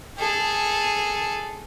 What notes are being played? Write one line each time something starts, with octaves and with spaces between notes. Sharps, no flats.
G#4 A4